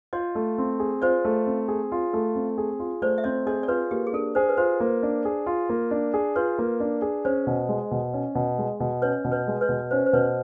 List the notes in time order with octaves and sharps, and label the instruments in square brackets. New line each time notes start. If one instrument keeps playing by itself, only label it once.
[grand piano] F4 [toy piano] C#5 D#5
[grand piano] A3
C4
G#4
[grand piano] F4 [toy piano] C5 D5
[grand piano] A3
C4
G#4
F4
A3
C4
G#4
F4
[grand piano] A3 [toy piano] C5 D5
[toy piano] E5
[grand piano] C4 [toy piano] C#5 D#5
[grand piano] G#4 [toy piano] C#5 D#5
[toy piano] D5
[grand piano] F4 [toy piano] B4 C#5
[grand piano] A#3 [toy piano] G4
[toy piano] G#4
[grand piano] D4 [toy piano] A4
[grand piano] G#4 [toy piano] C5
[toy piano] B4
[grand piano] F4 [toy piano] C5
[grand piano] A#3
D4
G#4
F4
A#3
D4
G#4
[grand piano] F4 [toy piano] B4 C#5
[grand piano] A#3
D4
G#4
[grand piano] C#4 [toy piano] C5 D5
[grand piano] B2
G#3
B2
C#4
B2
G#3
B2
[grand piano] C#4 [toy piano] B4 C#5
[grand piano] B2
[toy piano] B4 C#5
[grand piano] G#3
[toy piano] B4 C#5
[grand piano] B2
[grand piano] C#4 [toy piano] C5
[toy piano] C5
[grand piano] B2 [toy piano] B4 C#5